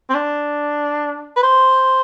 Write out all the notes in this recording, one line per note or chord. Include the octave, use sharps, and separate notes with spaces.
C4
D4
B4
C5